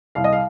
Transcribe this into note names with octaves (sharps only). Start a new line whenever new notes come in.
C2 F5
D#5
F5